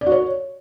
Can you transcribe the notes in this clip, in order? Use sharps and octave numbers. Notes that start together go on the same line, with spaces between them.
D5
F#4
C#5